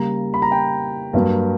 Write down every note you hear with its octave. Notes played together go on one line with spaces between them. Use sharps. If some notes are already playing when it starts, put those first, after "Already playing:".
Already playing: C#3 G3 A#3 A#5
B5
A#5
G5
G2 F#3 A#3